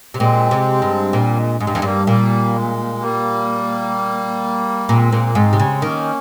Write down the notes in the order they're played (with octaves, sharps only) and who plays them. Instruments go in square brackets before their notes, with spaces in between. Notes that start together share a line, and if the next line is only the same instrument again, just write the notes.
[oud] C3
[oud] A#2 [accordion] G#3 C4
[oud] C3
G2
[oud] A#2 [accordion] G3 A#3
[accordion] G#3
[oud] G#2 [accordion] G#3
[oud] G2
F2
[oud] G2 [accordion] G3 A#3
[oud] A#2 [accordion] G3 A#3
[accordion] G#3
G3 A#3
[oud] A#2 [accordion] G#3 C4
[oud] A#2
[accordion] A#3
[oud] G#2 [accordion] G#3 C4
[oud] C3
C#3
[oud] D#3 [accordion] A#3 C#4